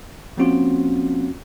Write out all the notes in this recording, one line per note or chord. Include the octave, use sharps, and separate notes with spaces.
F3 A#3 C4 C#4 F4 F#4